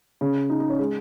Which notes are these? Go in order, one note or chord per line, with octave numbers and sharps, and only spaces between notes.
C#3
D#4
D#4
C#4
G#3